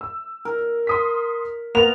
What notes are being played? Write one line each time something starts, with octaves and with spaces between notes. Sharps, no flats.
E6
A#4
C6 D#6 B6
A#3 B3 A#4 F7